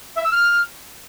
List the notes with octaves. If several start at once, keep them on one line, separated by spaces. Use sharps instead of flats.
E5
E6
F6